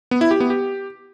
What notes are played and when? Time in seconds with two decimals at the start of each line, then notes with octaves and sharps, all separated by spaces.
0.11 B3
0.21 E4
0.31 G4
0.40 B3
0.50 G4